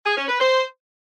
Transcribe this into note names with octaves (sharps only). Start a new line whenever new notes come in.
G#4
C#4
B4
C5